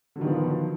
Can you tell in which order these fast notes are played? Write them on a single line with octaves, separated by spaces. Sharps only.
D3 F#3 D#3 B3 F3